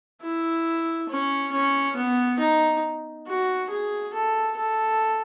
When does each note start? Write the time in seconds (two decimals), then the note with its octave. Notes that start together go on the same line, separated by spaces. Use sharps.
0.22 E4
1.09 C#4
1.53 C#4
1.96 B3
2.39 D#4
3.27 F#4
3.70 G#4
4.14 A4
4.57 A4